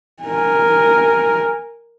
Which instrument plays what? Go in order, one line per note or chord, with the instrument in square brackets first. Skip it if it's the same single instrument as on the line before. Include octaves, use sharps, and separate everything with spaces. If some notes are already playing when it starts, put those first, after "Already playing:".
[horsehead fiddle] A#4 G#5